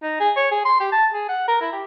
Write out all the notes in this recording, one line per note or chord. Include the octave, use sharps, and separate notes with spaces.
D#4
G#4
C#5
G#4
C6
G4
A5
G#4
F#5
A#4
E4
G4